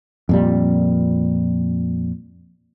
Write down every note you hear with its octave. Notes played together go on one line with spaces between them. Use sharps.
F2 A#2 G3